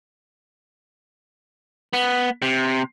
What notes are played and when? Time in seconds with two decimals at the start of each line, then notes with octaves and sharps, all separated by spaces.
1.93 B3
2.42 C3